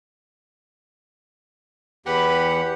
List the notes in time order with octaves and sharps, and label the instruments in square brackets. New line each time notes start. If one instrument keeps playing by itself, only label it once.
[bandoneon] E2 G4 F#5 [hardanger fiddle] B4